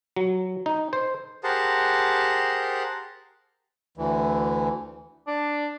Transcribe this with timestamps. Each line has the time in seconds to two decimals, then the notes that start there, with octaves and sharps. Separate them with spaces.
0.16 F#3
0.66 D#4
0.93 C5
1.44 G4 G#4 A#4 C5 F#5 A5
3.97 D2 E3
5.27 D4